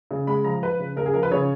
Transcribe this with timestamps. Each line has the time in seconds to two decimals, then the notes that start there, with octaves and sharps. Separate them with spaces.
0.11 C#3
0.27 G#3 B5
0.44 F3 A#5
0.62 F3 B4
0.79 C#3
0.96 C#3 A#4
1.06 G#4
1.14 F3 A#4
1.23 B4
1.31 C#3 C#5